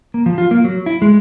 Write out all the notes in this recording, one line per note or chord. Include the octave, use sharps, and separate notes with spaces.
A#3
F3
F4
A#3
F#3
E4
G#3